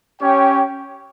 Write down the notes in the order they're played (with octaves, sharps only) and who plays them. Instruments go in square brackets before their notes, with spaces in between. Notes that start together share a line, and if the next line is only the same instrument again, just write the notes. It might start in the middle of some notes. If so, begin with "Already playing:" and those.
[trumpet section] C#4 G4 C#5 G5